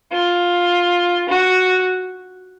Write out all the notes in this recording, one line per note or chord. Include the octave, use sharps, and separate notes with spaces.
F4
F#4